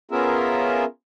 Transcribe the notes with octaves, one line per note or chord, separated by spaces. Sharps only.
B3 C#4 F4 G#4 A#4 E5